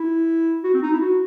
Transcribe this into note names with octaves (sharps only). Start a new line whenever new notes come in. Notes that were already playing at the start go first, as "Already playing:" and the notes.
Already playing: E4
F#4
C4
D#4
E4
F#4